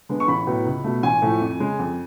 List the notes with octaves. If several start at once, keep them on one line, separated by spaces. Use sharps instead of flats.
D3 G#3 B3
C#6
A1 B5
A2 F#3 B3
C#2
B2 A3
A1 G#5
A2 F3 A3
F2
C#3 G#3
F2